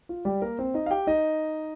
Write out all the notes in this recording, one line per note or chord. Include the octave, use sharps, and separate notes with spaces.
F4
G3 G4
A#3 A#4
C4 C5
D#4 D#5
F5
G4 G5
D#4 D#5